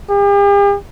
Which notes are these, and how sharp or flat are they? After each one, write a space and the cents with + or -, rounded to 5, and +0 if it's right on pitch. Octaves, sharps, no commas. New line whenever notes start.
G4 +45